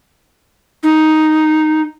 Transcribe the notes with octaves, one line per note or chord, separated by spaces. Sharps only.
D#4